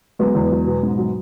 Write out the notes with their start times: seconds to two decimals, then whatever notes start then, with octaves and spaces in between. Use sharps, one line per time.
0.19 F#3 G#3 B3
0.35 E2
0.51 F#3
0.66 B2
0.83 G#2
0.98 F#3